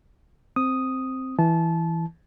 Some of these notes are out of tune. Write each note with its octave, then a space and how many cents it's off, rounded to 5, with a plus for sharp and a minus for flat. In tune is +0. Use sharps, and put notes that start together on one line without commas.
C4 +0 D#6 +0
E3 +0 A5 -25